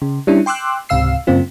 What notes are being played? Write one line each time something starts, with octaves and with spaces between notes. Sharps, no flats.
C#3
G3 C#4 D4 E4
G5 C6 D6 E6 F#6
C#2 G#2 C3 F5 E6 C7
F#2 C#3 A#3 C4 F4